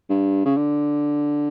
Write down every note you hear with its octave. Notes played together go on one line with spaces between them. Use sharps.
G2
C#3
D3